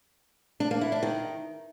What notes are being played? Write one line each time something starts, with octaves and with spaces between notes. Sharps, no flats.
D4
A#3
E4
D4
D#3